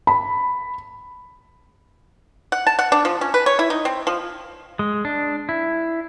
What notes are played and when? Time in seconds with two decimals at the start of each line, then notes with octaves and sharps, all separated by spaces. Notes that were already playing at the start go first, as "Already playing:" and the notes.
0.07 B5
2.52 F#5
2.67 A5
2.79 F#5
2.92 D4
3.05 F3
3.21 C#4
3.34 B4
3.46 C#5
3.59 E4
3.70 D#4
3.85 C4
4.07 F3
4.79 G#3
5.05 D4
5.49 E4